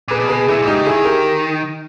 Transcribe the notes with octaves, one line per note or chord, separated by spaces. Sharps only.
A#2 G#4 B4
B2
G#4 B4
A#2 E4 G#4
G#2 D#4 G4
C#3
D#3 E4 G#4
G4 A#4